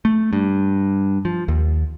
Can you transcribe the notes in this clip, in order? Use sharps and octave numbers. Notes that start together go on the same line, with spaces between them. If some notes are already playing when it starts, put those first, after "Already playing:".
A3
G2
F3
D#2